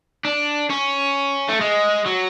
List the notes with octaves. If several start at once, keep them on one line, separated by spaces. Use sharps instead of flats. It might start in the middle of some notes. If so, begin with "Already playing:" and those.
D4
C#4
A3
G#3
F#3